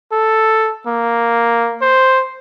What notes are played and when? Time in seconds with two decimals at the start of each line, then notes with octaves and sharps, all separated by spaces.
0.12 A4
0.87 A#3
1.81 C5